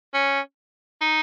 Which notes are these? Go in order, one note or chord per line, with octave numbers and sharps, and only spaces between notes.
C#4
D#4